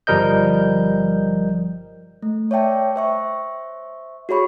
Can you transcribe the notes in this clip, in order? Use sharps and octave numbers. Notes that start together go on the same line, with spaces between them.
G1 F3 G3 A#4 D#5 G6
A3
C#5 D5 E5 G5 A5
C5 E5 C#6
F#4 G#4 C#5 B5 C#6